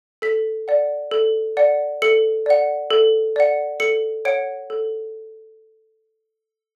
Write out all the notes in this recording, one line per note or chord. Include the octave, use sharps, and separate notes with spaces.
A4 B6
D5 F#5
A4
D5 F#5
A4 C#7
D5 F#5
A4
D5 F#5
A4 C#7
C#5 F#5 D7
A4